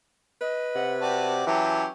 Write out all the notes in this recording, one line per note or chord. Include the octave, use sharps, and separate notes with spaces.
B4 D#5
C3 F#5
F#4 G4 D5 A5
E3 F#3 C#4 G4 A5